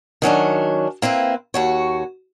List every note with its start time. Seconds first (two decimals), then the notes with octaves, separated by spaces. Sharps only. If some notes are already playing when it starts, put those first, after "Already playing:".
0.22 D#3 F#3 C#4 D4
1.02 A#3 C4 E4 B4
1.54 D#2 F#4 C#5